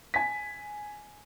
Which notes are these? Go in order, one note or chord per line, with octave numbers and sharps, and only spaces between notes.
G#5 B6